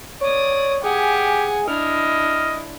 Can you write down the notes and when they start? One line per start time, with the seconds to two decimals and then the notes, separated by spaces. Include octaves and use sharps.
0.21 C#5 D5 D#6
0.84 G4 G#4 F#5 G#5
1.68 D4 E4 D#5 F6